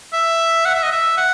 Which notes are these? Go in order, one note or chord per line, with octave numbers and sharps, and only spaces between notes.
E5
F#5
E5
D#5
E5
F#5